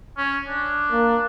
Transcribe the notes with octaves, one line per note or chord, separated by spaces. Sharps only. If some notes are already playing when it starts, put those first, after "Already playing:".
C#4
D4
A#3